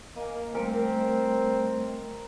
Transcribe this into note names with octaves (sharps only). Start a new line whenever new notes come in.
A#3 D#5 G#5
G3 A3 C4 A#4 D#5